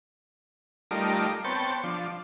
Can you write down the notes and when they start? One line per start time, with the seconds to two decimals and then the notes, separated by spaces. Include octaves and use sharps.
0.91 G3 A3 D#4 F4 A#4 D5
1.44 B3 C4 C#5 G5 A5
1.84 F3 D4